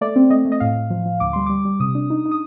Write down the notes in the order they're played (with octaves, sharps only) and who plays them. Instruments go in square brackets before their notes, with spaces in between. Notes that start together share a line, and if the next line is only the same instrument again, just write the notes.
[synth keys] A3 D5
C4
A3 D#5
A3
D#5
A2 F5
A2
F3
F3
D2 D6
G3 C6
G3 D6
G3
C3 D#6
D4
D#4
D#4
D#6